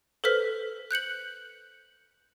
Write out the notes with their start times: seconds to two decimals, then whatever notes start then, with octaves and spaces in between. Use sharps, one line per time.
0.24 A4 B4 C5 F6 B6
0.91 F#6 G6 C#7 F#7